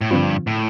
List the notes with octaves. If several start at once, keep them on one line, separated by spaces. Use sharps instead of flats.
A2
G2 D3 F3 C4 F4
A2